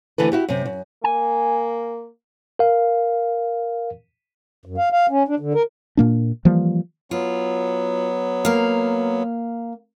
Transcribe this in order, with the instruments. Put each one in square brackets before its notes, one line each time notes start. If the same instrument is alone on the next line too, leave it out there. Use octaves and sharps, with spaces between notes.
[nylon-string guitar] D2 D3 E3 A4 B4
E4 F#4 G4
F#2 C3
F#2
[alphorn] A#3 [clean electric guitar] G#5
[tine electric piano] A#4 F5
[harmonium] F#2
F5
F5
C#4
D4
D3
A#4
[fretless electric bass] A#2 A#3 D4
E3 F3 G3 A#3
[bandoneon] F#3 B3 [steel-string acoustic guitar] F4
[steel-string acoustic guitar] A#3 F5